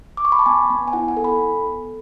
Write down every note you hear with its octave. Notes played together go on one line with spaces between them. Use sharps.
D6
C#6
B5
A5
B3 G#5
B3
G#5
E4 F#5
G#5
A4
B5
B3
A4